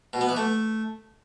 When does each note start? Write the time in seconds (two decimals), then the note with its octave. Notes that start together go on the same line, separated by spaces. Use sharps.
0.13 B2
0.21 B3
0.29 E3
0.37 A3